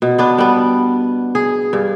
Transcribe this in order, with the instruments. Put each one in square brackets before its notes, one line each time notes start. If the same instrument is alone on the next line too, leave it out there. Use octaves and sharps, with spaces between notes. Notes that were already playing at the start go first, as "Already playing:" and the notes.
[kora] B2
B3 D4
G3 B3
G#4
G2